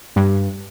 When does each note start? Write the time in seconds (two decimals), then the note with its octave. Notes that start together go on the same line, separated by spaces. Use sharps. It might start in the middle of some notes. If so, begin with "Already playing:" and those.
0.16 G2